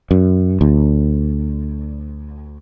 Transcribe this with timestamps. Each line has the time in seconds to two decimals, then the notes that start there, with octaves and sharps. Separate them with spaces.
0.11 F#2
0.61 D2